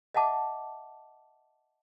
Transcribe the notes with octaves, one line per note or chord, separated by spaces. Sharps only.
D#5 E5 F#5 A5 D6